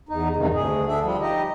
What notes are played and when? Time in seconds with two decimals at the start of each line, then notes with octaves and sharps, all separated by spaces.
0.09 E2 D#4
0.36 E2 G2 C3 D#3
0.54 D2 G#4
0.88 D3 D4 E5
1.03 F3 G3
1.21 D#4 G4 D#5